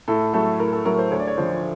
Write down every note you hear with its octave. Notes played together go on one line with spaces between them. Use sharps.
A2 A4
F#3 A3 A4
A2 A#4
A4
F#3 A3 A#4
C5
D2 C#5
D5
C#5
D3 F3 C5